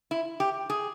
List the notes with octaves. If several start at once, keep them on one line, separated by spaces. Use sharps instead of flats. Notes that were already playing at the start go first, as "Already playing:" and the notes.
E4
G4
G#4